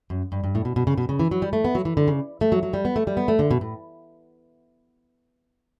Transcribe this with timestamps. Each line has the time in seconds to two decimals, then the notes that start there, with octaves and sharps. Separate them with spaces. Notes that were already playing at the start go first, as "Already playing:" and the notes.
0.10 F#2
0.32 G2
0.44 G2
0.55 A2
0.65 B2
0.76 B2
0.87 C#3
0.98 B2
1.09 C#3
1.19 E3
1.31 F#3
1.42 G3
1.53 A3
1.65 B3
1.75 F#3
1.85 E3
1.97 D3
2.08 C#3
2.41 A3
2.52 F#3
2.63 F#3
2.74 G3
2.85 B3
2.96 A3
3.07 G3
3.17 B3
3.28 A3
3.39 D3
3.51 B2
3.61 A2